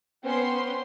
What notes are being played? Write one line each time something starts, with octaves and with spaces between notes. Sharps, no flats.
B3 C#4 C5 G5 C6